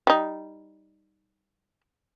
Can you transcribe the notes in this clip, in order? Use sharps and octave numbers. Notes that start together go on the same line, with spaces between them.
G3 D#4